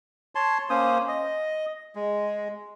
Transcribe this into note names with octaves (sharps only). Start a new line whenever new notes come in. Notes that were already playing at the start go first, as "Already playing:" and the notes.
C#5 A5 C6
A#3 C#4 C5 D#6
D#5
G#3